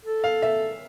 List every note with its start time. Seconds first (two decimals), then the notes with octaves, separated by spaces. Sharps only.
0.05 A4
0.24 F5
0.42 E5